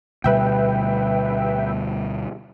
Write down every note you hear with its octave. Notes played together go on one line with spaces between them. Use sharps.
D2 B2 G3 B4 E5 G5